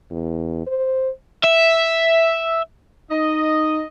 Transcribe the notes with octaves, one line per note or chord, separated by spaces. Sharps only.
E2
C5
E5
D#4 D#5